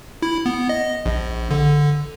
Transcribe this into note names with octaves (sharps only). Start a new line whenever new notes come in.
E4
B3
D#5
A#1
D3